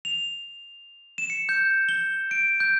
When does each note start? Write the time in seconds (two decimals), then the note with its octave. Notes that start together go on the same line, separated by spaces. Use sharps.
0.05 F7
1.18 E7
1.30 C#7
1.49 G6
1.89 G7
2.31 D7
2.60 G6